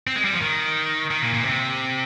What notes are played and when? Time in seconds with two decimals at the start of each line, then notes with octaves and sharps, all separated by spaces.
0.07 C4
0.16 G#3
0.25 G3
0.33 F3
0.41 D#3
1.11 D#3
1.22 A#2
1.34 A#2
1.45 C3